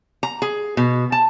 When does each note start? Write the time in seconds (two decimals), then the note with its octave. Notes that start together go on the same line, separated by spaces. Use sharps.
0.23 A#5
0.42 G#4
0.77 B2
1.12 A5